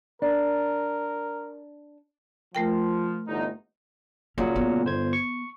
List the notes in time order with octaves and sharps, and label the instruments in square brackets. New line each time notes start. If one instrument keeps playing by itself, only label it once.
[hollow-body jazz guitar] D4 [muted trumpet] A#4
[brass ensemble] F3 [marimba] A3 A#4 G5
[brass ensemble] G1 E2 D#4
[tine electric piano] A#2 C#3 F#3 [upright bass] C#4
[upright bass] B3
[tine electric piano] G1 C5 G#6
C#6